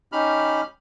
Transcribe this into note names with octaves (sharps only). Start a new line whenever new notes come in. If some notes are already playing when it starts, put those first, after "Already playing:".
C#4 D#4 G4 B5 F6